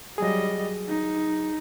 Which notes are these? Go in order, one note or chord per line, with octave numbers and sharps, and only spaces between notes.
F#3 G3 G#4 D#5
D#4